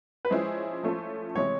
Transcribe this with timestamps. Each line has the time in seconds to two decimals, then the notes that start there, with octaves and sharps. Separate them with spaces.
0.25 B4
0.30 F3 G#3 C#4 E4 G#4 C5
0.83 F3 A3 C#4 F4 A4
1.35 C3 E3 G#3 C#5